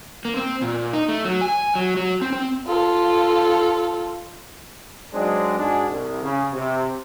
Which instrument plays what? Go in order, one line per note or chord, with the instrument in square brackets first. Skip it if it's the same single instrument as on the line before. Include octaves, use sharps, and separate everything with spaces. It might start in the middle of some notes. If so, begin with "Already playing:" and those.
[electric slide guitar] A#3
C4
A#2
D#4
A3
F#3
G#5
F#3
F#3
C4
C4
[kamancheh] F4 A4
[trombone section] F#3 G#3 C4 D4 D#4 G#4
G#2 D4 F#4 G#4
C2
C#3
C3